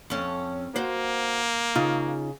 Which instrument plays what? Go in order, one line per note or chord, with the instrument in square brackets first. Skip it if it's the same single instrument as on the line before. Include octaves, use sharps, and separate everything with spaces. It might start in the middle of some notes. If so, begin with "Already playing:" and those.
[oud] F2 C#4
[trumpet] A#3 [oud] F#4 C5
[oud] C#3 [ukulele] D#4 F4